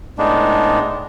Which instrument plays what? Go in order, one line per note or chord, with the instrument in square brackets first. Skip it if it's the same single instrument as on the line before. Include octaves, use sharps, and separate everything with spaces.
[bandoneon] A2 G#3 B3 D4 D#4